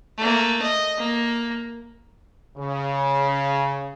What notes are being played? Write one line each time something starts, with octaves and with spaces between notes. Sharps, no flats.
A3 A#3
D#5
A#3
C#3